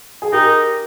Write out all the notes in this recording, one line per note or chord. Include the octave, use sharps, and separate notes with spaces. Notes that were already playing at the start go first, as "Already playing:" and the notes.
G#4
D#4 G4 A#4